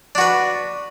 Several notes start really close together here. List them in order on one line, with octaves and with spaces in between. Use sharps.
D4 F#4 B4